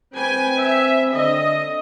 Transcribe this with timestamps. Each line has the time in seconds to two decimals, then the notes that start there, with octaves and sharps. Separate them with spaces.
0.14 C4 B4 G5 G#5
0.57 E5
1.15 D3 D#5